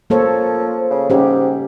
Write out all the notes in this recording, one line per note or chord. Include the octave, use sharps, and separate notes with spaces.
F3 A#3 A4 C#5
C#3
G#2 C#4 G4